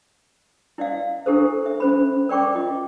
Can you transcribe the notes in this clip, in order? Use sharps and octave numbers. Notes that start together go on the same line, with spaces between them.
E4 D5 D#5 F5
D4 E4 G4 A4 A#4 C5
E5
C#4 C5 B5
A#4 D5 G5 C#6 D6
F4 D#5